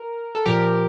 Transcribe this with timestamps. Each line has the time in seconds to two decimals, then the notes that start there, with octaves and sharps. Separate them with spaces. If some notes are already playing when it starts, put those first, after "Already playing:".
Already playing: A#4
0.35 A4
0.45 A#2 F3 G4 A#4